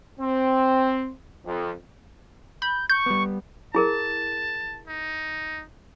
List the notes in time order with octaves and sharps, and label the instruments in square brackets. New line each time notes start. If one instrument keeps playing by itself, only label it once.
[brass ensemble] C4
F2
[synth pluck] B5 [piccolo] G6
[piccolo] C#6 [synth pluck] G6
[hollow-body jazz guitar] G3 B3
[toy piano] E4 G#4 A#4 [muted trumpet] A5
[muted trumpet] D#4